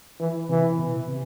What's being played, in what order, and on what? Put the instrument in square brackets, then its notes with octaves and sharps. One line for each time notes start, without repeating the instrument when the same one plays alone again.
[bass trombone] E3
[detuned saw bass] C3 [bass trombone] E3
[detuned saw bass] B2
C3